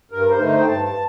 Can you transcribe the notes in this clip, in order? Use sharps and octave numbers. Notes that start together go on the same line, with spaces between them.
G2 A#4
C5
D3 A3 D#4
C5
G5
G2 A5
A5